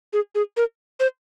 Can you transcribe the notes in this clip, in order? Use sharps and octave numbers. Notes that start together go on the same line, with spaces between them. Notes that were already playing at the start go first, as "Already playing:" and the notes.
G#4
G#4
A#4
C5